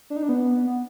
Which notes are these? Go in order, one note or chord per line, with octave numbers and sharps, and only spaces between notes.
D4
D#4
D4
B3